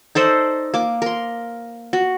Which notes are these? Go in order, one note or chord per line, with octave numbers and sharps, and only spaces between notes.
D#4 A4 C5 D5
A#3 D6
A#4 C6
F#4